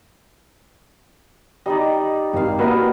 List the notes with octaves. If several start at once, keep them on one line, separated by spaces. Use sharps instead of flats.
G3 D#4 D5 D#5
G#1 G3 F5
A#3 E4 F#4 B4 D#5 E5